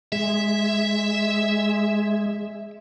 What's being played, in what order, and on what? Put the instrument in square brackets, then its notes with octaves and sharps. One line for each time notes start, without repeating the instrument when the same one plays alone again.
[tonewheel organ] G#3 [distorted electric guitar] E5